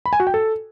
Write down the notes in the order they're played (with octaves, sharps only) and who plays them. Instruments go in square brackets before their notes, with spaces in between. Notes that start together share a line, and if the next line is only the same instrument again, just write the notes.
[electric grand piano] B5
G#5
F#4
G5
A4